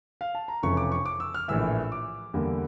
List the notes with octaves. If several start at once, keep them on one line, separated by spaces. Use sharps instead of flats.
F5
A5
A#5
F1 F2 C#3 E3 C#6
D6
C#6
D6
E6
F6
A#1 A2 E3 E6
D6
E2 D3 G3 A#3